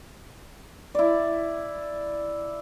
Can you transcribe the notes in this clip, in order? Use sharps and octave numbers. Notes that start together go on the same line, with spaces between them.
E4 D5